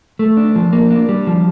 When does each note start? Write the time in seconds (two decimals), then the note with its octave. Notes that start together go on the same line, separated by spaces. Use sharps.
0.19 A3
0.37 D4
0.56 F3
0.73 A#3
0.91 D4
1.09 G3
1.27 F3